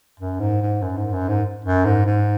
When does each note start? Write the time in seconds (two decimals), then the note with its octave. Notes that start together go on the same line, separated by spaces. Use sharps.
0.20 F#2
0.40 G#2
0.62 G#2
0.82 F#2
0.97 G#2
1.14 F#2
1.29 G#2
1.65 F#2
1.85 G#2
2.06 G#2